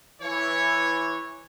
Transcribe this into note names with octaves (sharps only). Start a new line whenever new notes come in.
E3 C#5